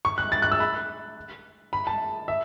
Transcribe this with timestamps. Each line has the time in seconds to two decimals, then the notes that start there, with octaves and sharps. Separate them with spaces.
0.05 C#6
0.18 F#6
0.32 A6
0.42 F#6
0.52 E6
0.60 B5
1.73 B5
1.87 A5
2.28 E5